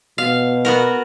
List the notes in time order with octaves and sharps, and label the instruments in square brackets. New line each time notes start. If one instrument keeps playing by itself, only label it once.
[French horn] B2 [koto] F5
[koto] B3 F#4 A#4